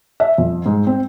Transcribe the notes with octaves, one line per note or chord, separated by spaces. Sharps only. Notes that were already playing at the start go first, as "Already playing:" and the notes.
E5
F2
G#2
C4